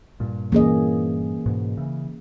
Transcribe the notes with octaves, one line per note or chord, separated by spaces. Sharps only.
G2 A#2
E3 A#3 C#4 G#4 D#5
G#2 B2
C#3 E3